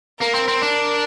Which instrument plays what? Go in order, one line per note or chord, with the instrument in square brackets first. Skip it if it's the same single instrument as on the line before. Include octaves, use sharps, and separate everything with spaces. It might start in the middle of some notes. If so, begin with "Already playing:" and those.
[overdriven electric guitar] A#3 [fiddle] A#4
[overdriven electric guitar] C4
C4
D4